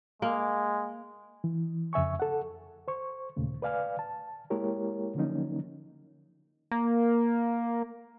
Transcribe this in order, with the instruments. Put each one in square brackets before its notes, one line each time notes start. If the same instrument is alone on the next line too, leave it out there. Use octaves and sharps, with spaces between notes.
[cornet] G#3 [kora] A#3
[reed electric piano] E3
F2 C#3 E5 G#5 C#6
A4 F#5
C5 C#6
D#2 A#2 C#3 A3
B4 D5 F5 G#5 F6
A5
G#3 A#3 E4 G4 A#4 C#5
D3 F3 F#3 A#3 C#4 D#4
[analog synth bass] A#3